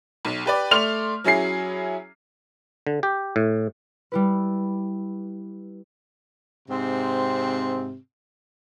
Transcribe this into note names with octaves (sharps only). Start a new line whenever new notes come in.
B1
G4 B4 D5
A3 D5 C6 F6 F7
F#3 C#4 E4 G#4 C7
D3
G4
A2
G3 E4 B4
G#2 C3 C4